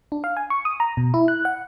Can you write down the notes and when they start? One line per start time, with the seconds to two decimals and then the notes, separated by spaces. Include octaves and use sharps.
0.12 D4
0.24 F5
0.37 G#5
0.50 C#6
0.65 D#6
0.80 A#5
0.97 B2
1.14 E4
1.28 F#6
1.45 F#5